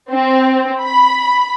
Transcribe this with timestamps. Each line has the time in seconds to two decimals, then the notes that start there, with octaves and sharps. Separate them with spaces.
0.11 C4
0.82 B5